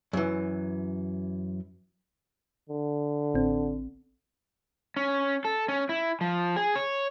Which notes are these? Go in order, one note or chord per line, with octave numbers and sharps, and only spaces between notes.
F#2 E3
D3
A1 C4
C#4
A4
C#4
E4
F3
G#4
C#5